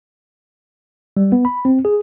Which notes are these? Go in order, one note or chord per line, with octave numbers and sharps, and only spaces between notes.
G3
B3
B5
C4
G#4